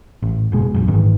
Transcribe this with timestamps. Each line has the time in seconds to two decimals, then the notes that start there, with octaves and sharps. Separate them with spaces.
0.22 A1
0.52 F#1 B2 G#3
0.74 E1 A#1 F#2
0.87 G1 G#2 D#3 E3